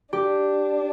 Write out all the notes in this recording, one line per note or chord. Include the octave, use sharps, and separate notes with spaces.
D4 G4